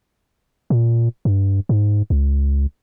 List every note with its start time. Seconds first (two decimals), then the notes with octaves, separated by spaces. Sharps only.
0.70 A#2
1.25 G2
1.69 G#2
2.10 C#2